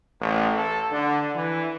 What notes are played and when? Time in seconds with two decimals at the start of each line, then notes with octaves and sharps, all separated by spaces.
0.20 A1
0.56 A4
0.92 D3
1.36 E3